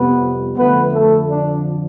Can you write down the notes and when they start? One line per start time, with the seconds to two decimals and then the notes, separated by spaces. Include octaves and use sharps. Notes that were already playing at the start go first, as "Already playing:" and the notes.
Already playing: F2 C3 G3 B3 B4
0.57 F2 D3 F3 A3 B3 B4
0.93 A3 A4
1.28 D4